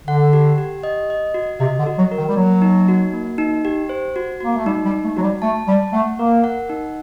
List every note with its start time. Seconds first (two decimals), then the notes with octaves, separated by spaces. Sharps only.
0.08 D3 F#5
0.33 G4
0.58 G4
0.83 D#5
1.10 D#5
1.34 F#4
1.60 C3 D#5
1.80 D3
1.86 F#4
1.99 F#3
2.11 A#4
2.18 D#3
2.29 G3
2.36 F#3 A#3
2.62 D#4
2.88 F#4
3.13 A#3
3.38 D#4
3.65 G4
3.89 C5
4.16 F#4
4.41 A#3 F#4
4.55 A3
4.66 G3 D#4
4.85 G3
4.91 D#4
5.04 A3
5.17 F#3 F#4
5.23 G3
5.42 A3 A5
5.68 G3 A5
5.93 A3 F#5
6.19 A#3 A#4
6.44 F#5
6.69 D#4